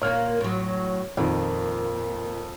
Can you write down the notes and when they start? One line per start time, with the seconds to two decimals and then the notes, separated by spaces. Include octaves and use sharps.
0.02 A#2 A#3 C#5 F6
0.41 A2 F#3
1.17 F2 A#2 D#3